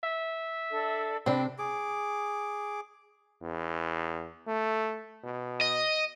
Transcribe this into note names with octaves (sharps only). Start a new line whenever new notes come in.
E5
D4 A4 D5
C3 C4 D4 G5 B5
G#4 D6
E2
A3
B2
D#5